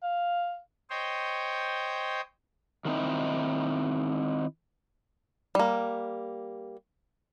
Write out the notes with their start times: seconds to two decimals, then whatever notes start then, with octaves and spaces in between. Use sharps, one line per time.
0.03 F5
0.90 C5 C#5 D#5 G5
2.85 D#3 F#3 A3 C4 D#4 E4
5.55 G3 A#3